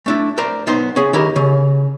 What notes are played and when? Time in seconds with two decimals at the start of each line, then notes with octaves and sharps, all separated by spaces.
0.06 A3 D4 E4
0.38 A#4 C5 D5 A#5
0.67 B1 B3 D#4 C5 C6
0.96 C#4 G#4
1.13 D#3 E4 G4 A#4
1.36 C#3 C#4